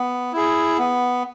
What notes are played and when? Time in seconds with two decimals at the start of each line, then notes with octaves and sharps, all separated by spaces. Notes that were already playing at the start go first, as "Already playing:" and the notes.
Already playing: B3
0.33 E4 G#4
0.78 B3